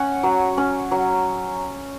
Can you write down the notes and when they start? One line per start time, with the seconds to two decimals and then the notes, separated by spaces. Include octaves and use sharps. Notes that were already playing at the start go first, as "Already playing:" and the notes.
Already playing: C#4 C#5 F#5 G#5
0.23 F#3
0.57 C#4
0.91 F#3